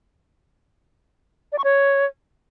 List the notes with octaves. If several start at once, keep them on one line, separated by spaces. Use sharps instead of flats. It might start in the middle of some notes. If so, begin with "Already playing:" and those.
D5
C#6
C#5